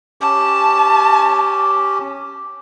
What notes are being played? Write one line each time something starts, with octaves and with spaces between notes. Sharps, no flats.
C#4 G4 A5